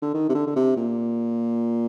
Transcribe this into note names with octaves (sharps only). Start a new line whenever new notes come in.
D3
D#3
C3
D3
D3
C3
A#2